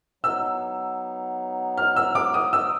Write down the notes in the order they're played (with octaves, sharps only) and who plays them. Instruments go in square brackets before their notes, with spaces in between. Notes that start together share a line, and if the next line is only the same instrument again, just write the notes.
[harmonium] F#3 B3 D#4 [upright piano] E6
[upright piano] F6
E6
D6
D#6
E6